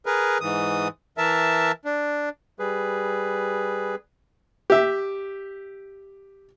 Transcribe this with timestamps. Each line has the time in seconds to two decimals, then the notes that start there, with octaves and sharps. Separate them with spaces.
0.06 G#4 A#4 B4
0.41 G#2 E3 D#6
1.18 E3 A#4 E5 A5
1.85 D4
2.59 G3 G#4 B4
4.70 G4 E5